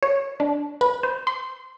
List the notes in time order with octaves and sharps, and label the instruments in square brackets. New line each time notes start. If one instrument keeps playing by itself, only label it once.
[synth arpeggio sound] C#5
D4
B4
C5
C6